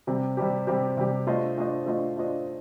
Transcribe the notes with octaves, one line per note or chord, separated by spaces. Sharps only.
C3 G3 C4 G4
C3 G3 C4 G4
C3 G3 C4 G4
C3 G3 C4 G4
A3 D4 F4 C5 D#5
A3 D4 F4 C5 D#5
A3 D4 F4 C5 D#5
A3 D4 F4 C5 D#5